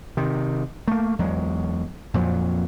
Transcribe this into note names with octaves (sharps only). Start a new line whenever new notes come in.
C3 D#3
A3 A#3
E2 F#3 G#3
F2 A#2 F3 F#3